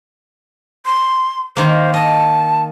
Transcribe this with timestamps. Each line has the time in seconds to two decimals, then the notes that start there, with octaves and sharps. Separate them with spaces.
0.86 C6
1.57 D#3 A#3 C5
1.94 D#5 A5